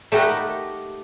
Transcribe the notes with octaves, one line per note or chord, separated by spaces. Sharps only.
A3 D#4 G4 A#4 F#5 B5